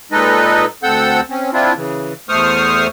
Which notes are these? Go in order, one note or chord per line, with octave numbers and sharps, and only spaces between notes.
A#2 G#3 D#4 A4 B4 D#5
D2 C4 A4 F#5 E6 G6
C4 C#4
C4 D4 E4 F4
C#3 E3
E2 A3 C5 C#6 D#6 F6